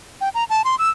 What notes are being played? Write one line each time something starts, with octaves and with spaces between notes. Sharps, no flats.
G5
A#5
A5
C6
E6